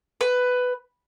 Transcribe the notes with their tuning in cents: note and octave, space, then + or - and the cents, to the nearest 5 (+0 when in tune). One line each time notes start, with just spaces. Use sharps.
B4 +10